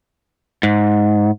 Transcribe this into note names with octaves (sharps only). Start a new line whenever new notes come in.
G#2